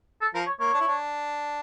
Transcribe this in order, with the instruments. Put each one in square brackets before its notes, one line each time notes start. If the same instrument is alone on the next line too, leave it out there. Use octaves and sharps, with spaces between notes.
[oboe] A4
[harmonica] F3 [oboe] A#4
[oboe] C#5
[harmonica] A#3 [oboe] C#5
[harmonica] D4
E4
D4